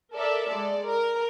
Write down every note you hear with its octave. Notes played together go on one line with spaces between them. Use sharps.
A4 A#4 D5 E5
G#3 A4 D5
A#4